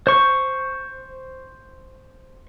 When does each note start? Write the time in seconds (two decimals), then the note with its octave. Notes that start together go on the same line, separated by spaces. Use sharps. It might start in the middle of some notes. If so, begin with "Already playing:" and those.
0.07 C5 C#6